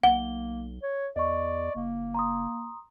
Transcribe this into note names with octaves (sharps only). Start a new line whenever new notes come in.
B1 A#3 F#5 G7
C#5
E2 D5 D#5 C#6
F#1 A#3
A#5 C6 D#6